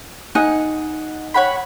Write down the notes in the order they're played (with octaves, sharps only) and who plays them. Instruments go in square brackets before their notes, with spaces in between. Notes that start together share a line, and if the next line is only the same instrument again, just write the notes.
[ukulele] D#4 G#5 [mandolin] F#5
[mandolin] C#5 F#5 B5